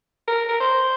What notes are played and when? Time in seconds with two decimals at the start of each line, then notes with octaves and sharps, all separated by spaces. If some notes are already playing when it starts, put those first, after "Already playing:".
0.28 A#4
0.48 A#4
0.60 C5